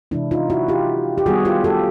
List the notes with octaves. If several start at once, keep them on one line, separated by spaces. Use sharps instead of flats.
C3 E3 G#3 D4 E4
D#4 F4
E4 F#4
F4 G4
G4
D#3 G3 B3 F#4 G#4
F4 G4
G4 A4